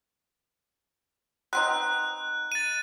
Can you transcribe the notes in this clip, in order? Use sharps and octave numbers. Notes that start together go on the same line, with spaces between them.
B3 C4 D#4 F#6
A6 D#7